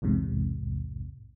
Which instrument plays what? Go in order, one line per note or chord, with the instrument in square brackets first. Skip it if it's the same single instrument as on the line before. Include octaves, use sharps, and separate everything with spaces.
[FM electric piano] B1 E2 G#2 C3